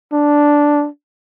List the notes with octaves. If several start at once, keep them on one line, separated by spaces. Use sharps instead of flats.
D4